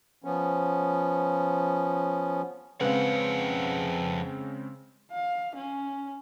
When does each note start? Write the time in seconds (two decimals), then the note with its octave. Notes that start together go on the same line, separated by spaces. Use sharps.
0.24 F3 B3 C#4
2.81 F2 C#3 G#3 C4 B4 F5 F#5
5.11 F5
5.55 C#4